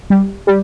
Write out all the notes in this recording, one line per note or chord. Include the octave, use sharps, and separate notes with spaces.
G3
G3